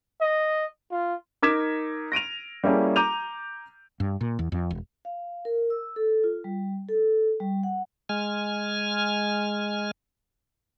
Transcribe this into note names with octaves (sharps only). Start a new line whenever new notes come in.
D#5
F4
D#4 A#4 D6 G#6 B6 E7
A#6 D7 D#7 F7
G3 A#3 C#4 E4 G#4 A4
A#5 D6 G6 D#7 F7
G2
A#2
E2
F2
E1
F5
A#4
E6
A4
F4
G3
A4
G3
F#5
G#3 G#5 F6